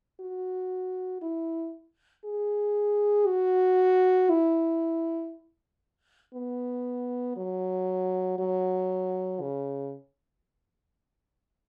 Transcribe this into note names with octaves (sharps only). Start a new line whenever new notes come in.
F#4
E4
G#4
F#4
E4
B3
F#3
F#3
C#3